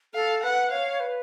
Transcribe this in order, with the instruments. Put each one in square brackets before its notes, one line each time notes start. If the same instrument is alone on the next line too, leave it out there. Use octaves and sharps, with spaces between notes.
[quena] A4 [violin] F5
[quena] B4 [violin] F#5
[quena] C#5 [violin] F5
[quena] B4